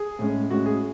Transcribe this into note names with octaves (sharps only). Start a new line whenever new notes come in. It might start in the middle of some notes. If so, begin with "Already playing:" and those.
Already playing: G#4
A2 G#3 C#4
A2 G#3 C#4 F#4
G#4